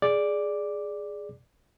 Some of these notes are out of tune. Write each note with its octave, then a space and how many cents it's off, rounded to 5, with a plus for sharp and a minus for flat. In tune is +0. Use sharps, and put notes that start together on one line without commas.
G#4 +0 D5 +0 D6 +0